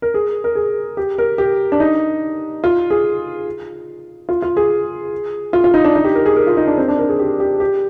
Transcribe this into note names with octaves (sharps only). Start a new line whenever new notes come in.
A#4
G#4
A#4
G#4
G4
A#4
G4
D4
D#4
F4
G#4
F4
F4
G#4
F4
F4
D#4
D4
D#4
G4
A#4
G#4
A#4
F4
D#4
D4
C4
D4
A#4
G#4
G4
G4
G4